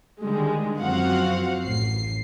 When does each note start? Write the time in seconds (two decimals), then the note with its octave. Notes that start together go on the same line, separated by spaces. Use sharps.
0.23 D3 D#3 G3 G#3
0.79 F#2 F3 C4 F#4 F5 F#5
1.65 A1 C7